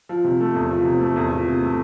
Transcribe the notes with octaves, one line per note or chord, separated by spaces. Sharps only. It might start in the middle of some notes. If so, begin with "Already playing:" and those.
F3
C3
A3
E2
F3
C3
A3
E2
F3
C3
A3